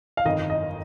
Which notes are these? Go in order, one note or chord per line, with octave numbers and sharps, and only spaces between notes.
F5
G1 F2 D#3 D#5
D#5